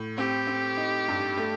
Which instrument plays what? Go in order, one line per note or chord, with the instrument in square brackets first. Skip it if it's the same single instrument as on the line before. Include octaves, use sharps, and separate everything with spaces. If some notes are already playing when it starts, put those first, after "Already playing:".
Already playing: [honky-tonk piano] A2
[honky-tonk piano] C4 [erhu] G4
[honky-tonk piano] C4
D#4
G2
A3